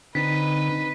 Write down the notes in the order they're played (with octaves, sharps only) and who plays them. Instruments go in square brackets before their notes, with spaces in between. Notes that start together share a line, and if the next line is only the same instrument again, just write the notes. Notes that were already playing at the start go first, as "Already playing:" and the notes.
[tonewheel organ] D3 [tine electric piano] C4 D#4 [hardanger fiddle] B4 D#5 [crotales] B6